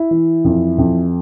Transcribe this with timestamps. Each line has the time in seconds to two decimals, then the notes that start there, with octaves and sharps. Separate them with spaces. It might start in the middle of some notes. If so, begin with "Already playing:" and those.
Already playing: E4
0.11 E3
0.45 F2
0.78 F2